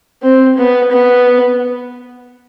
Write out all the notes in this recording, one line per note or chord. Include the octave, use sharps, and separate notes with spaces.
C4
B3
B3